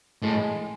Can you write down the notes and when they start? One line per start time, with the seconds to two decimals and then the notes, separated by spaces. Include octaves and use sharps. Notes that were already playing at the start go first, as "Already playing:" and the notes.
0.22 A2 G#3